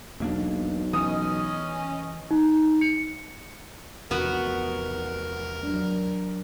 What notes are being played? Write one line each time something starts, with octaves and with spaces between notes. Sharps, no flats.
E1 B1 A#3 D4
E3 C#4 D#5 D#6
D#4
C#7
E2 C3 F3 B3 F#4 A#4
F#3 D4